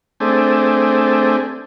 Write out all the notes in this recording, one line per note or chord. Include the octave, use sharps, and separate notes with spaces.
A3 C4 D4 G#4